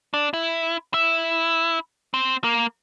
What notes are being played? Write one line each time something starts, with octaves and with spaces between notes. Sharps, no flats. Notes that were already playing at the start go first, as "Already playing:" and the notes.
D4
E4
E4
C4
A#3